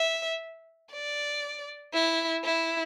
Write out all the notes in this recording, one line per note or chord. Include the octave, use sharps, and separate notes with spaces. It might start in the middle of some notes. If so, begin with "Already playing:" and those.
Already playing: E5
D5
E4
E4